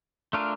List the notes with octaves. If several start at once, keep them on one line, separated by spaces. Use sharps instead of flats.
A3 D4 F4 A#4